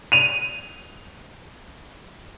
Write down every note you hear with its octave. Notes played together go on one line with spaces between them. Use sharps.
D#7 F7